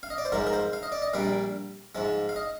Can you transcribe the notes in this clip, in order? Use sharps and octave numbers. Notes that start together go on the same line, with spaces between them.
F5
D#5
D5
C5
G#2 F3 G#3 A#4
A#4
C5
F5
D#5
D5
D#5
A#1 A#2 G3 A#3 F5
G#2 F3 G#3
F5
D#5